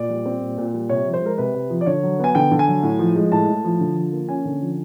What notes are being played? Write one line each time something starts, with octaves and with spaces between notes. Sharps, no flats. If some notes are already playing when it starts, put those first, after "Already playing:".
Already playing: A#2 D5
G3
C4
A#2
A#2
G3
C3 C#5
F3
C5
G#3 A#4
C3 B4
C3
F3
D5
D3 C#5
F#3
B3 G#5
D3 G5
D3
G#5
F#3
A2
F3
G#3
A2 A5
A2
F3
D3
F3
A#3
C#4 G#5
D3
F3